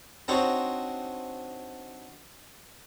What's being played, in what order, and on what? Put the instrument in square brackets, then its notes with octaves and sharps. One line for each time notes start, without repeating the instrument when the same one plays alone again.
[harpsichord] C4 D4 D#4 F#4 C5 C#5